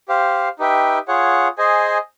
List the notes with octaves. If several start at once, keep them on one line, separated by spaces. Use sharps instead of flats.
G4 C5 F5
D#4 G4 B4 E5 G5
F4 G#4 C#5 F#5
G#4 C5 D#5 G#5